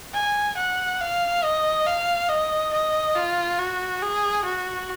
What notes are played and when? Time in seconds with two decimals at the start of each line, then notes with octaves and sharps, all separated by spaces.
0.14 G#5
0.57 F#5
1.01 F5
1.43 D#5
1.86 F5
2.29 D#5
2.73 D#5
3.15 F4
3.59 F#4
4.02 G#4
4.45 F#4